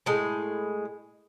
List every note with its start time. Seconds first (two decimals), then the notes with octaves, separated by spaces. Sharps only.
0.06 A2 G#3